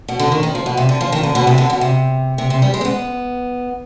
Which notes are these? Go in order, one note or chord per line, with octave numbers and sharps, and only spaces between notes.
B2
D3
D#3
D#3
F3
B2
C3
D3
F3
D#3
D3
B2
C3
D3
B2
C3
C3
C3
G3
G#3
C4
B3